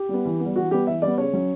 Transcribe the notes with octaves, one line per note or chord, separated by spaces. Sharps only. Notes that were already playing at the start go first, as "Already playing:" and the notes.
Already playing: G4
G3 B3
E3
G3 B3
E3 F#4
G3 B3 G4
E3 E5
G3 B3 D5
C#3 C#5
F#3 C#4